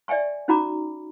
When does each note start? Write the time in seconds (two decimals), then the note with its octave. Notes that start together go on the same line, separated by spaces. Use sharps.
0.08 D5 E5 G5 G#5 C#6
0.48 C#4 D#4 F#4 A#5 B5 D6